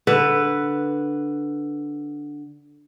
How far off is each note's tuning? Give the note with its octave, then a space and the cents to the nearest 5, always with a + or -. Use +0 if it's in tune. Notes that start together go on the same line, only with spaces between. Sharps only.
D3 +0 B4 +0